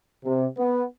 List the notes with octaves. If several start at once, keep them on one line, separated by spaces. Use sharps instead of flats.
C3
B3